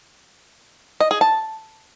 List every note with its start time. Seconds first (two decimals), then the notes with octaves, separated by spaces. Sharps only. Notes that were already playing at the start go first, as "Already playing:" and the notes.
1.00 D#5
1.11 G#4
1.21 A5